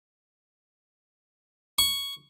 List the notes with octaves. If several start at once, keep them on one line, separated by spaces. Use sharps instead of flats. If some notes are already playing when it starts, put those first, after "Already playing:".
C#6